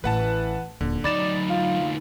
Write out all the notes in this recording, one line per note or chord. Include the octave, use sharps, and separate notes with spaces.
A1 E3 B4 F#5 A5
D#1 D3
D2 F#3 D#4 D5 B5 A6 E7
F4